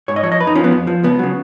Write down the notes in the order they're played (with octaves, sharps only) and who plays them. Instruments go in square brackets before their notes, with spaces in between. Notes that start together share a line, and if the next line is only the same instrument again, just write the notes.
[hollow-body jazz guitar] G#2 C#5
D#5
F3 C#5
D#5
F2 B4
D#4
F3 C#4
B3
F2
F3
C#2 B3
C#3 F#3